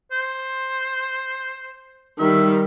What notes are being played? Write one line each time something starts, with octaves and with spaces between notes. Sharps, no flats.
C5
D#3 G3 E5